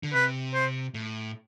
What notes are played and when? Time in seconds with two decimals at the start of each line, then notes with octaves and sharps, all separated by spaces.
0.03 D3
0.13 C3 B4
0.54 C5
0.94 A2